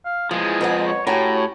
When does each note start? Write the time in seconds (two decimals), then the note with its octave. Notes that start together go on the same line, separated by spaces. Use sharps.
0.05 F5
0.31 E3 F3 G#3 G#4
0.61 F2 B4 F#5
0.86 C#5
1.07 A2 C#4 F#4 G4 A#5
1.36 C#5